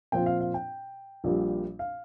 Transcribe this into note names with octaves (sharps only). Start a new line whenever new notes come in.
A#2 F3 C4 F4 G5
F5
F5
G5
A#1 A#2 G3
F5